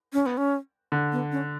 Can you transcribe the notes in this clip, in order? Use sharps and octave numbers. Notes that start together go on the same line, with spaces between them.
C#4
B3
C#4
D3
B3
C#4